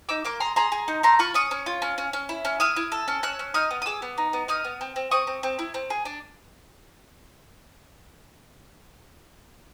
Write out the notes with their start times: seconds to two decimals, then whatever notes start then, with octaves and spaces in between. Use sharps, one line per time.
0.09 D#4 D6 E6
0.25 A#3 C6 D6
0.40 G#4 A#5 C6
0.56 G#4 A#5 C6
0.72 G#4
0.88 D#4
1.03 A3 A#5 C6
1.19 F4 B5 C#6
1.34 C#4 C#6 D#6
1.51 C#4
1.66 F4
1.82 C#4
1.98 C#4
2.13 C#4
2.29 E4
2.45 C#4
2.60 E4 D#6 F6
2.76 E4
2.92 A4
3.08 C#4
3.23 C#4 E6 F#6
3.39 C#4
3.54 D#4 D#6 F6
3.71 B3
3.82 D#6
3.86 G#4 D6 E6
4.02 B3
4.18 D#4
4.33 B3
4.48 D#4 D#6 F6
4.64 B3
4.81 C4
4.96 C4
5.11 C4 C#6 D#6
5.27 C4
5.43 C4
5.59 E4
5.74 C4
5.90 G#4
6.05 D4